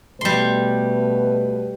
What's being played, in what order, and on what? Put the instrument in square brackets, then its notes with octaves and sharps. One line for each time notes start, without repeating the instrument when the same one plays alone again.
[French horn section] B2 A3 B4 [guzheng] G3 C6